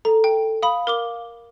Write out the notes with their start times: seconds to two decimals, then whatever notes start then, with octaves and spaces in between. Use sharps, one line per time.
0.05 A4 A#5
0.24 G5
0.63 F5 B5 D#6
0.87 A#4 D6 G7